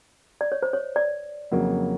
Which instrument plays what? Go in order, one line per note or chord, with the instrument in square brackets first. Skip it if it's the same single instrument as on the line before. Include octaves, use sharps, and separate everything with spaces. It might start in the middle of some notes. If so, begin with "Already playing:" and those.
[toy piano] D5
C#5
C5
C#5
D5
[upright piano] F2 C#3 F#3 A#3